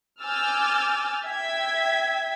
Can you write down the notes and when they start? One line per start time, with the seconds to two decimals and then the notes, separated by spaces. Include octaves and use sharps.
0.23 G#5 D6 E6 F6 G6 A6
1.24 E5 G5 G#6 B6